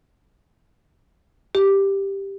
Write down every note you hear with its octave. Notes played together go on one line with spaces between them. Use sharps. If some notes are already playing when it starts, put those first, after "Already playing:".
G4